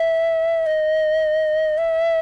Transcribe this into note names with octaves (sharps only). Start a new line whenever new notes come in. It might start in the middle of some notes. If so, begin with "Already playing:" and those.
Already playing: E5
D#5
E5